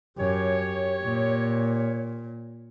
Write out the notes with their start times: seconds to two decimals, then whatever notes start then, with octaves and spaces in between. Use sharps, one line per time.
0.18 F#2 G4 C#5
1.04 A#2